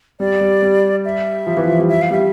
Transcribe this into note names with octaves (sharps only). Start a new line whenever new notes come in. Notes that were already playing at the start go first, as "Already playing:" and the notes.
G3 D5
G3
G3
E5
F3
E3
F3
G3
E5
F5
G3 E5